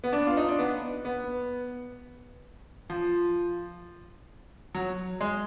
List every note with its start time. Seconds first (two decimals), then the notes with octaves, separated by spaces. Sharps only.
0.04 B3
0.13 D4
0.27 F4
0.37 D#4
0.48 D4
0.59 B3
1.05 B3
2.90 F3
4.75 F#3
5.21 G#3